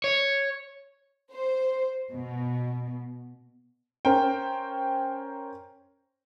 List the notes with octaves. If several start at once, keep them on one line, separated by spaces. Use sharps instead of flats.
C#5
C5
B2
C#4 A#4 C5 G5